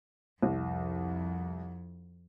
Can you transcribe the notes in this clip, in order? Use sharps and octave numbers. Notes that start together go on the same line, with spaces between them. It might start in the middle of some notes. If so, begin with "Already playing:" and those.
C2 F2